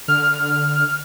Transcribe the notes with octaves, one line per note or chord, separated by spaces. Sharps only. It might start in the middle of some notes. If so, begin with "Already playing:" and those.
D3 F6